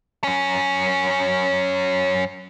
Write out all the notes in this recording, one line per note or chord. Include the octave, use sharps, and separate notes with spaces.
F#2 C#4